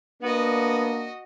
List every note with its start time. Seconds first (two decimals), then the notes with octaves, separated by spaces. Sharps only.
0.23 A#3 B3 D4 F#4 D#5